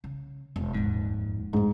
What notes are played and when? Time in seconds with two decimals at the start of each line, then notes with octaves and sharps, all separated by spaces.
0.04 C#3
0.56 E1
0.74 D#1 F2 G#2
1.53 A1 F2 G#2